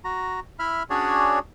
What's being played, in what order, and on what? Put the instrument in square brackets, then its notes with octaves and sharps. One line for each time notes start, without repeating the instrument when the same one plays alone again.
[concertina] F#4 A#5
E4 E5 B5 F6
C#4 D4 F#4 G#4 C#5 D5